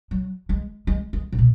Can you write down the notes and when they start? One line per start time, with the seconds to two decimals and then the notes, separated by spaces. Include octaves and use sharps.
0.11 F#3
0.49 G#3
0.87 G#3
1.13 G#3
1.32 C#3
1.39 B2